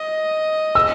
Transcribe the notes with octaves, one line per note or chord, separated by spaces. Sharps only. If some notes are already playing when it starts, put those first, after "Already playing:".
Already playing: D#5
E6